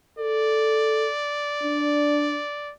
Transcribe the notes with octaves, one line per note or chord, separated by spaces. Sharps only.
A4 D5
D4